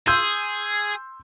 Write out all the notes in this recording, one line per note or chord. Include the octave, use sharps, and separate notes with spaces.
G#4 C6 E6 G6